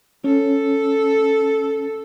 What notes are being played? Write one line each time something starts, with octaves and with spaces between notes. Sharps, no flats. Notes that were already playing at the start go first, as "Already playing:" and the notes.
C#4 A4